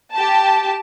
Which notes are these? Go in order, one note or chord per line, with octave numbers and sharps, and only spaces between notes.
G4 A5